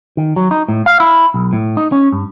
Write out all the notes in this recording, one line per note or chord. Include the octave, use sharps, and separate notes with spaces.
D#3
F#3
D#4
A2
F5
E4
B1
A2
D#4
C#4
G2